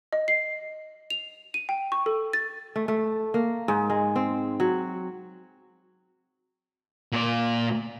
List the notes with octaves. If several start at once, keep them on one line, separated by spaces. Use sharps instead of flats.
D#5
C7
F7
D#7
G5
C#6
A4
A6
A3
A3
A#3
G#2
G#3
C4
F#3
A#2 D5